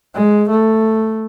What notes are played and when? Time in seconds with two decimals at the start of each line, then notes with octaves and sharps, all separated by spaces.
0.15 G#3
0.50 A3